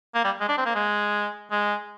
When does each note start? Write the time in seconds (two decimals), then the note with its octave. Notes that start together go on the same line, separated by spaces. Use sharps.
0.15 A#3
0.24 G3
0.41 G#3
0.49 D4
0.58 C4
0.66 A#3
0.75 G#3
1.51 G#3